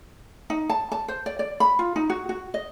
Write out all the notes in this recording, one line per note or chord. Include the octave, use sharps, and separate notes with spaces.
D#4
A5
A5
C5
D5
D5
B5
F4
D#4
F#4
F#4
D#5